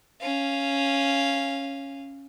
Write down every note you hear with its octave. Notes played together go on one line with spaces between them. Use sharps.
C#4 F5